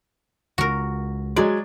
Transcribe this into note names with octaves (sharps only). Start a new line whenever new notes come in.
C#2 F#4 A#4
F#3 G#3 D5